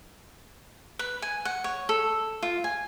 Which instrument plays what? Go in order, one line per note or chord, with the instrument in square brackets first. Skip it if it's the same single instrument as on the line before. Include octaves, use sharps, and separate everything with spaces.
[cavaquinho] B4
G#5
F#5
C#5
A4
F4
G#5